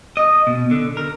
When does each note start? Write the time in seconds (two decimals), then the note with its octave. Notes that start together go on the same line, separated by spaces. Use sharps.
0.17 D#5
0.47 B2
0.71 D3
0.97 A#4